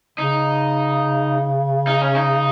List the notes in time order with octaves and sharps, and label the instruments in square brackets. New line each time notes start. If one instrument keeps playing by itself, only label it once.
[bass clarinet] C#3 [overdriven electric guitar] D#4
[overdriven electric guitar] D#4
C#4
D#4